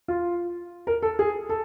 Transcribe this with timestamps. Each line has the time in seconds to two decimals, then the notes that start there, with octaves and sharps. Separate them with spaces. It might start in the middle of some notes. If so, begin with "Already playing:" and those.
0.08 F4
0.87 A#4
1.02 A4
1.19 G#4
1.49 A4